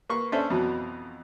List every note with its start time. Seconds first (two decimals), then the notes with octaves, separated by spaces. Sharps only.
0.09 A#3 B4 C#6
0.32 C#4 D4 A4 C5 E5
0.50 F2 B2 E3 F#3